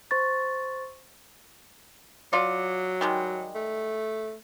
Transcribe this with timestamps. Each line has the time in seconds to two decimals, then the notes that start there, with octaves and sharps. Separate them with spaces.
0.11 C5 C6 C#6 A6
2.33 F#3 F4 D5
3.01 D#3 G3 G#3
3.55 A3